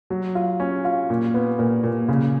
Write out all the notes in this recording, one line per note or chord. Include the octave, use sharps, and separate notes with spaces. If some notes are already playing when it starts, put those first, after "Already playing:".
F#3
F4
C#4
F4
A#2
B3
A#2
A#2
C#3